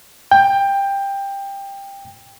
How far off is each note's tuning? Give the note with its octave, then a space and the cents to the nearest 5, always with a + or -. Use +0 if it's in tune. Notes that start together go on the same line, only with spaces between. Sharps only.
G5 +15